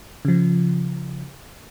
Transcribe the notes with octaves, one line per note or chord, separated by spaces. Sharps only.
C#3 F3